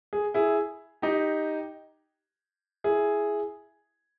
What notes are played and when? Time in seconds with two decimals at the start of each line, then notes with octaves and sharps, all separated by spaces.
0.13 G#4
0.34 E4 G#4
1.02 D#4 G4
2.84 E4 G#4